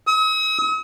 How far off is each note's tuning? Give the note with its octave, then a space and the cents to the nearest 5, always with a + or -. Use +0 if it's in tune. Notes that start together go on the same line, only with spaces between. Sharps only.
D#6 +45